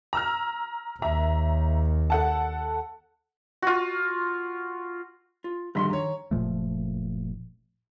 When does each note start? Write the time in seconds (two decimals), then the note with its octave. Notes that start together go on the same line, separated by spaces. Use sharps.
0.13 A#5 E6 F6
1.02 D#2 E5 A#5
2.10 A4 F#5 A5
3.62 F4 F#4
5.44 F4
5.75 A#1 G2 D3 D#3 B5 C6
5.90 C#5 A#5
6.31 F#1 A#2 F3 A3